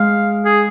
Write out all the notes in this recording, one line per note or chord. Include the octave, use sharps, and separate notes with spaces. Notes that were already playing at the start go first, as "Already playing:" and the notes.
Already playing: G#3 F5
G#4